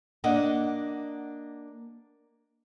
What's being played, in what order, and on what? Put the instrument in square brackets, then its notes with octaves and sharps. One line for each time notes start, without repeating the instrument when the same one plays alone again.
[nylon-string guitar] A#3 D4 D#5 F#5